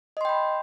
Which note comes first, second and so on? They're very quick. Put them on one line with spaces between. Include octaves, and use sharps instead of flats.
D#5 C6 G5 B5